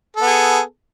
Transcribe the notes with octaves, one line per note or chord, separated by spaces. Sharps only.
B3 G#4 A4